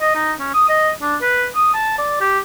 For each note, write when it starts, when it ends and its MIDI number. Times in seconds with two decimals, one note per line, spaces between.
0.01 0.14 75
0.15 0.32 63
0.39 0.54 61
0.54 0.65 87
0.69 0.91 75
1.02 1.16 62
1.22 1.47 71
1.55 1.74 87
1.74 1.97 81
1.98 2.16 74
2.21 2.39 67